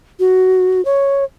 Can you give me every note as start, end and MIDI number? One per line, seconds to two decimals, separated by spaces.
0.20 0.84 66
0.85 1.24 73